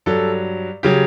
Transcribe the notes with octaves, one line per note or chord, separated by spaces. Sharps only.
G2 F#3 A4
C#3 F#3 G4